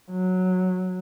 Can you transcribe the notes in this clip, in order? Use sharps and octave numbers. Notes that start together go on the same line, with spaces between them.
F#3